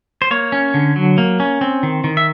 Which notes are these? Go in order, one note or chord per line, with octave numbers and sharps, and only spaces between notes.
C5
A#3 C#5
C#4
D3
F#3
A#3
C#4
C4
D#3
D#3
E5